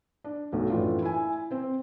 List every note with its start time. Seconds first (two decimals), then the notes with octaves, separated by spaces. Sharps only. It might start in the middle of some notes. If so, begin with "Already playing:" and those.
0.24 D4
0.52 B1 A3
0.70 F#2 A2 E3 A3 D4 F4
1.02 E4 G#5
1.51 C4 C5